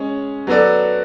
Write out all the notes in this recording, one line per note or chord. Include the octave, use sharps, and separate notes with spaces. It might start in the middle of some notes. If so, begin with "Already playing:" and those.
Already playing: G#3 C#4 G#4 C#5
F#3 B3 F#4 A4 D5